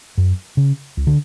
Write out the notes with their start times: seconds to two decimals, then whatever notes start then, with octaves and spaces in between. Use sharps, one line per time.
0.18 F#2
0.57 C#3
0.97 C#2
1.07 D3